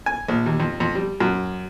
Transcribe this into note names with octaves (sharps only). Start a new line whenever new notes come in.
G#5
A#1
D#2
F2
F2
G3
F#2